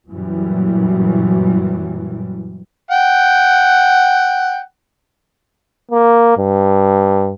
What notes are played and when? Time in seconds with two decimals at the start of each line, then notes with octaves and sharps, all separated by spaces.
0.10 F#2 A#2 E3 F#3 G3
2.91 F#5 G5
5.91 A#3
6.38 G2